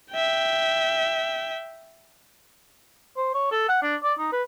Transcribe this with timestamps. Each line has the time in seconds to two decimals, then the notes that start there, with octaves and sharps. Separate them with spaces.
0.11 E5 G5
3.17 C5
3.34 C#5
3.51 A4
3.69 F#5
3.83 D4
4.03 D5
4.19 D#4
4.32 B4